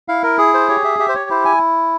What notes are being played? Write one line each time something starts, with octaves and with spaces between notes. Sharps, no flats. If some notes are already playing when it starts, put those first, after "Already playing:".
E4 F5
A#4
G#4
C5
G4 C#5
E5
G4 E5
C5
C#5
E4 C5
G#5